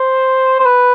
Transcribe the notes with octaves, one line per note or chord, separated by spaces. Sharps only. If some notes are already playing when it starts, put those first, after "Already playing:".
Already playing: C5
C5
B4